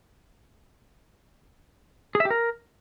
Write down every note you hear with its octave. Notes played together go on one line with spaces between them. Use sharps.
G#4
E5
G4
A#4